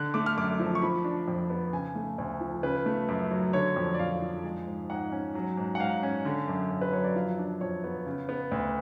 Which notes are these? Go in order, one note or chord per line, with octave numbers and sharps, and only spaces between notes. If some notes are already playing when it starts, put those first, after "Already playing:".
Already playing: D3 F#6
A3 D6
F6
F#2 D6
F3
C#6
F3 B5
D4
F2
B3
C#3 G#5
A3
D2
F3
C#3 B4
A3
F#2
F#3
D3 C#5
F2
D5
F2 F5
F3
G#3
G#2
G#2 F#5
C#4
F#3
G#2
F#5
G#2 F5
C#4
D3
F#2
F#2
B4
F#3 C#5
D5
F3 F5
D4
F2 C#5
B3
C#3
B3
D2